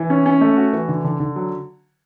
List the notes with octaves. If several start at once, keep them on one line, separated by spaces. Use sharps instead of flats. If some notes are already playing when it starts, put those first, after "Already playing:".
Already playing: E3
C#4
C#4
A3
F#4
E3
D3
D3
D3
F#3